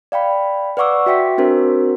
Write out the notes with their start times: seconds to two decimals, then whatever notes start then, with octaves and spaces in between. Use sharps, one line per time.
0.12 D5 F5 G5 B5
0.77 B4 D5 F#5 C#6 D6 E6
1.06 F#4 E5 G5 B6
1.38 C4 D4 F#4 A#4 C5